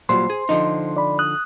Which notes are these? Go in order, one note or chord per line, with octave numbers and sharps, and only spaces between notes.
A#2 F#3 G3 C5 C6
G#4
D3 F3 D#4
D5 B5
D#6 F#6